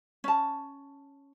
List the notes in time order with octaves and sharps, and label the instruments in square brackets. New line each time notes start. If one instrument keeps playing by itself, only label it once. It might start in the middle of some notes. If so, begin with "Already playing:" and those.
[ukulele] C#4 A5